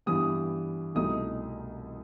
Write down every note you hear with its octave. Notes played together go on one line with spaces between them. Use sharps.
G2 E3 G3 B3 D#6
C2 B2 A3 D#4 D#6